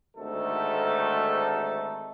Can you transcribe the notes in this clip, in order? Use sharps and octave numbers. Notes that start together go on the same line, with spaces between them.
G#1 D2 A3 D#4 A4